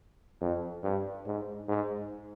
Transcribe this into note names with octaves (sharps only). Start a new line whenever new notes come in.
F2
G2
G#2
G#2